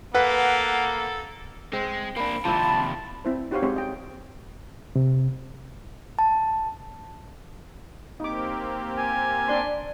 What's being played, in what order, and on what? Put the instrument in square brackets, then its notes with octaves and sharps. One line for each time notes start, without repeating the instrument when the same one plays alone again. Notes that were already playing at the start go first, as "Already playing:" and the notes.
[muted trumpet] A#3 [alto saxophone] A4 [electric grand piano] B4 F#5
[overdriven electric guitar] G#3 [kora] C4
[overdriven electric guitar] A#3 D4 [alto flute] B5
[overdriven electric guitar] D#2 C3 [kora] F3 D4 E4 [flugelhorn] A5
[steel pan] C4 E4 C5
D#4 F#4 G4 C5 C#5 F5
G#3 C4 C#4 G4 C5 C#5
D#5 G5
[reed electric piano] C3
[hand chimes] A5
[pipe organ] A#3 C4 G4 [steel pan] D#4 D6
[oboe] G#5
[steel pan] D4 D5 C6